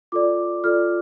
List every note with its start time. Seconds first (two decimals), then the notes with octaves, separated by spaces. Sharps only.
0.12 F4 A4 D5 D6
0.64 F4 A4 D5 F6